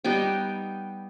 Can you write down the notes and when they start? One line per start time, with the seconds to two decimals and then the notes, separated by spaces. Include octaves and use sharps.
0.04 G3 B3 D#4 G5